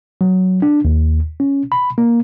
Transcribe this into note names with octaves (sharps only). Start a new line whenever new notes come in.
F#3
D4
D#2
C#4
B5
A#3